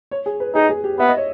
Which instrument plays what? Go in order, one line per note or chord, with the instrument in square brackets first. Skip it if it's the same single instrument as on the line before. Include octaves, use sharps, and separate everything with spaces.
[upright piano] C#5
G#4
B4
[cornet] D#4 [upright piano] G#4
[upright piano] G#4
G4
[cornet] B3 [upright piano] E5
[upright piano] D#5
C#5